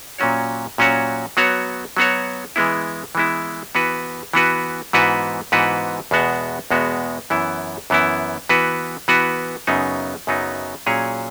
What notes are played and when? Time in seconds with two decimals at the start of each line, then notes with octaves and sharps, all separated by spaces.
0.18 A#2 F#3 C#4 F#4 C#5
0.78 A#2 F#3 C#4 F#4 C#5
1.37 F#3 B3 F#4 C#5
1.97 F#3 B3 F#4 C#5
2.56 E3 G#3 B3 E4
3.15 E3 G#3 B3 E4
3.75 E3 B3 F#4 B4
4.33 E3 B3 F#4 B4
4.93 G#2 E3 B3 F#4 B4
5.52 G#2 E3 B3 F#4 B4
6.11 E2 B2 G#3 B3 F#4
6.71 E2 B2 G#3 B3 F#4
7.30 F#2 E3 B3 E4
7.90 F#2 E3 B3 E4
8.49 E3 B3 F#4 B4
9.08 E3 B3 F#4 B4
9.67 F#2 C#3 F#3 B3 D#4
10.27 F#2 C#3 F#3 B3 D#4
10.86 A#2 F#3 C#4 G#4 C#5